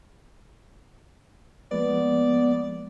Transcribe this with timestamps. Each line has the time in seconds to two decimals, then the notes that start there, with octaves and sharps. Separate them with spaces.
1.71 F3 G#3 A#3 B3 D5